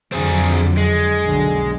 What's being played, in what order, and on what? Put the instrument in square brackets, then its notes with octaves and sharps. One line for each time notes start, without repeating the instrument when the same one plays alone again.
[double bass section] F2 D3 F#3 [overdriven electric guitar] C4 G#4
[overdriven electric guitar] G#3
[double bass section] B1 D3 F#3